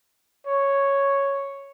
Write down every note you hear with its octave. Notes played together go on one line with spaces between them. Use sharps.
C#5